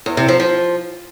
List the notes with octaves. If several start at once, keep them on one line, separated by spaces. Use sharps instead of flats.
E2
C3
F3
F3